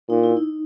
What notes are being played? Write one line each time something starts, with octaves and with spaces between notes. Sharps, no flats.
A#2 D#4
E4
D#4